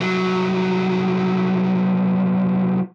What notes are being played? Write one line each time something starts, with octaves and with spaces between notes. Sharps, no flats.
C2 F#3